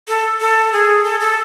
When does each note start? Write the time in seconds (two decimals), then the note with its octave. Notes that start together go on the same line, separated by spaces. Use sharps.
0.08 A4
0.41 A4
0.73 G#4
1.04 A4
1.20 A4